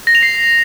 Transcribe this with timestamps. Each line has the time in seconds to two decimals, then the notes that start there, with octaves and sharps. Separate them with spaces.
0.07 A#6
0.15 F7
0.23 C7